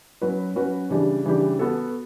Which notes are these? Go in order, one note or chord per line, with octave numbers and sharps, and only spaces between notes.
F#3 C#4 F#4 B4
F#3 C#4 F#4 B4
C#3 E3 G3 D4 G4
C#3 E3 G3 D4 G4
B3 F#4 A4